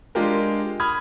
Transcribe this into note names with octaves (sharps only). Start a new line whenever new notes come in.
G#3 D4 F4 G4 A#4
B5 D#6 F6 G#6